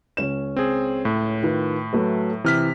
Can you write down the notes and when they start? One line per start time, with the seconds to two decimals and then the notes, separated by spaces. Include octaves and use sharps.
0.17 C#2 C#4 E7
0.56 C4 G#4
1.05 A2
1.43 D#3 F4 B4
1.93 F#3 A3 B4
2.44 C3 E3 F6 B6